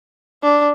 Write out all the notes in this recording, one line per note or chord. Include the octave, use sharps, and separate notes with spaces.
D4